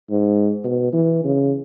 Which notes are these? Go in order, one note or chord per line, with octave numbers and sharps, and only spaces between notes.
G#2
B2
E3
C#3